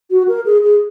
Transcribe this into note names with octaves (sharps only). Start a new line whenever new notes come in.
F#4
A#4
G#4
G#4